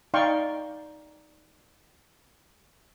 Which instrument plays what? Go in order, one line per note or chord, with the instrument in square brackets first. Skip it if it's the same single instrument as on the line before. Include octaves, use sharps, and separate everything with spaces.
[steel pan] D#4 D5 F5 G5 C6 C#6